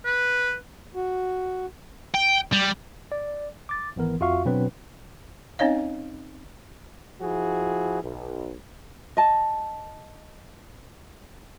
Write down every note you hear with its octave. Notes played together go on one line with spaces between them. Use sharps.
B4
F#4
G5
G3
D5
D6 A6
G#1 E3 B3 A#4
F2 F4 F#4 E5 F5 C#6
B2 F#3 C4 D4 B4
C4 C#4 D#4 C#5 D#5 F5
F3 E4 F#4 G#4
B1
D#5 A5